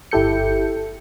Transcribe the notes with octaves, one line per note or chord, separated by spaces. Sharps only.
G1 E4 G4 A4 G6 C#7